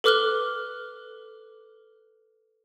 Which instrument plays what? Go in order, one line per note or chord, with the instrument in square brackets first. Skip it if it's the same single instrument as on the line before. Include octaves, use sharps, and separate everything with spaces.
[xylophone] A4 B4 D6 F6 F#6 G7